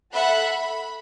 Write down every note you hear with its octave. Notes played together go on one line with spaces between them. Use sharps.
A4 E5 F#5 B5 F#6
B5